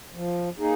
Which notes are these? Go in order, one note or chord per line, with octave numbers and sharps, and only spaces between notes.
F3
A#3 D#4 G#4